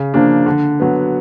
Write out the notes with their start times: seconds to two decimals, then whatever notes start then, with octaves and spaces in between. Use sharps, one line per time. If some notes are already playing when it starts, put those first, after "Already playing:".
Already playing: C#3
0.14 F3 A#3 D4
0.46 D3
0.80 F#3 B3